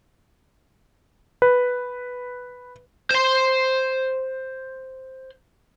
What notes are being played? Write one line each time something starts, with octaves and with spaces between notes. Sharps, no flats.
B4
C5 C6